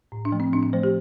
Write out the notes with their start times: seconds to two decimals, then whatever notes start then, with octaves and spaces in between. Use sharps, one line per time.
0.12 A2
0.25 D4
0.32 F3 A3
0.40 C4
0.53 A2 D4
0.63 D4
0.73 F3 A3 C5
0.83 G4